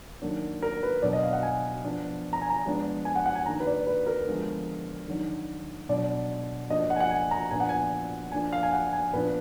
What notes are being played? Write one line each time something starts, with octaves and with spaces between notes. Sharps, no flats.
D#3 F#3 A#3 D4
A#4
B4
B2 F#3 B3 D4 D5
D#5
F5
F#5
G#5
F3 B3 D4
A#5
G#5
A#5
F3 G#3 B3 D4
G#5
F#5
F#5
G#5
D#3 A#3 D4 A#5
B4
D5
B4
A#4
D3 F3 G#3 B3 D4
D#3 F#3 D4
B2 F#3 B3 D4 D5
F3 A#3 D4 D#5
D#5
F#5
G#5
F#5
G#5
A#5
A#2 F3 B3 D4 G#5
F#5
G#5
F3 A#3 D4 G#5
F5
G#5
F#5
G#5
A#2 F3 B3 D4 B4